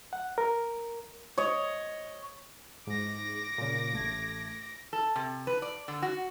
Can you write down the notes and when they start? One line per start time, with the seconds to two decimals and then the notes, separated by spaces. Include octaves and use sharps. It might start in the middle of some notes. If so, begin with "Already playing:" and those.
0.13 F#5
0.38 A#4
1.38 C#5 D#5
2.87 G#2 D6 A#6
3.58 A#2 C#3
3.93 A1 A3 G#6
4.93 A4
5.16 C3
5.47 B4
5.62 D5
5.88 D3
6.02 F#4